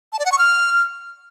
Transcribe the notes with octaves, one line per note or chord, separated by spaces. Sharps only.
A5
D5
F#5
C#6
F6